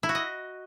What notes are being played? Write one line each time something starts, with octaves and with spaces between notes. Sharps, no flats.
E4
F#4
D#5